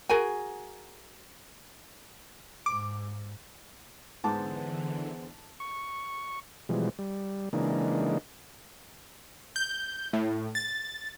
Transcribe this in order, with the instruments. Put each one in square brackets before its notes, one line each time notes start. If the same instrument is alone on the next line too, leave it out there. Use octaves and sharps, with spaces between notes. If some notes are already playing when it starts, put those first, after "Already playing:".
[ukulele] F#4 G#4 A#4 G#5
[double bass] G#2 [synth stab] D6
[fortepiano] G#2 D6 [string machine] D3 E3 [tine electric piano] B3 G#4 C5 [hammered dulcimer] A5
[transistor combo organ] C#6
B2 E3 F3 G3 G#3
G3
C#3 E3 G#3 A#3 D4 D#4
[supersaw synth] G6
A2
A6